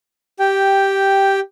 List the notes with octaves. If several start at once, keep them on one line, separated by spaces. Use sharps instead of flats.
G4 G5